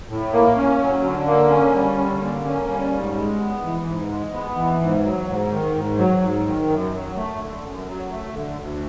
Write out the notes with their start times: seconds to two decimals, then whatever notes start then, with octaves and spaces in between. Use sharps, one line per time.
0.09 A2
0.33 A#3
0.56 C#4
0.80 F#3
1.04 D3
1.27 A#3
1.50 C#4
1.75 G3
1.98 D3
2.22 A#3
2.45 C#4
2.68 G3
2.92 G#2
3.15 G#3
3.40 B3
3.63 E3
3.86 G#2
4.11 G#3
4.33 B3
4.57 E3
4.81 G#2
5.04 F#3
5.28 G#2
5.51 D#3
5.74 G#2
5.98 F#3
6.23 G#2
6.46 D#3
6.69 F#2
6.93 F#3
7.16 A3
7.40 D3
7.63 F#2
7.87 F#3
8.11 A3
8.34 D3
8.58 D2